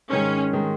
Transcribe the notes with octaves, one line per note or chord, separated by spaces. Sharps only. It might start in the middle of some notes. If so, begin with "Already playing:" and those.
G#2 D#3 G#3 C#4
D#3 G#3